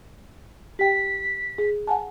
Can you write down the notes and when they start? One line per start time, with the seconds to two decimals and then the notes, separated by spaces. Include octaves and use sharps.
0.79 G4 G5 B6
1.58 G#4
1.87 F#5 G#5 A5